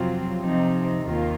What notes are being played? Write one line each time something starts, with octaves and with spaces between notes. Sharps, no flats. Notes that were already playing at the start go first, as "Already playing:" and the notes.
Already playing: F2 C3 F#3 C4 F4
C3 F3 C4 D#4
D#2 D#3 A#3 F4